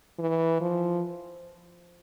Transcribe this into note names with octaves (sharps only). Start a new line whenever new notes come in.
E3
F3